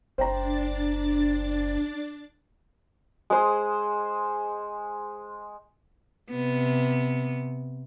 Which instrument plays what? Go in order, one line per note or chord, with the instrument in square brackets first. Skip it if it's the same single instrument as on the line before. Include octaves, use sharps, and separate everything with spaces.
[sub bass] F#1 [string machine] D4 A6 [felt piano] C5 G5 A#5
[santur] G#3 G#4 C5
[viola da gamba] C3 B3